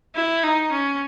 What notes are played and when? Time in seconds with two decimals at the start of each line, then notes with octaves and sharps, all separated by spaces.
0.15 E4
0.44 D#4
0.72 C#4